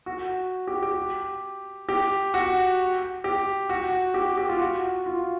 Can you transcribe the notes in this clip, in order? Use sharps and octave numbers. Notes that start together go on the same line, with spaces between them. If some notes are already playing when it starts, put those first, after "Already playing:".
F#4
G4
G4
G4
F#4
G4
F#4
G4
G4
F4
F#4
F4